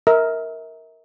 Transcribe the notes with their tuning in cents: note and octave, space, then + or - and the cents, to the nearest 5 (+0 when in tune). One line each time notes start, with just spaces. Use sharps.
A#4 +0 E5 -40